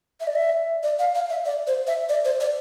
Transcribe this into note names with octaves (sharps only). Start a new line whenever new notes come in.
E5
D5
E5
D5
F5
F5
E5
D5
C5
E5
D5
C5
D5